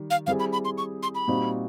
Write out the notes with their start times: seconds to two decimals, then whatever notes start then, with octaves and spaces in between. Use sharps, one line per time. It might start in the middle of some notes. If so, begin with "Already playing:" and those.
Already playing: D#3 G3
0.10 F5
0.27 G3 C4 E4 G#4 F5
0.40 B5
0.52 B5
0.65 C6
0.78 C#6
1.03 C6
1.15 B5
1.28 A#2 G3 C4 D#4 F#4